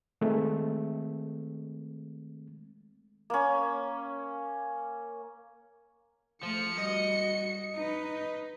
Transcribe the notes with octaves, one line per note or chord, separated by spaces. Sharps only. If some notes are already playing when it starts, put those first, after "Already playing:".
D#3 G#3 A3 C4
A#3 C#4
F3 A3 C#7
G3 F#4 D#5
D#4 B4